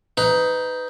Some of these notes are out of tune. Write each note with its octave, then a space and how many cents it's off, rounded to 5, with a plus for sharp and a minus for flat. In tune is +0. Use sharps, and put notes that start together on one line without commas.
D#4 +10 B4 +25